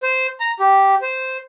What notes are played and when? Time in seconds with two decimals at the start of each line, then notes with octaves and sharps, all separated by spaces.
0.03 C5
0.40 A#5
0.60 G4
1.02 C5